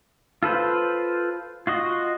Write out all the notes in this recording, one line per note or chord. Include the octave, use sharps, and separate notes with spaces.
F4 A4 B4 C5
F4 F#4 D#5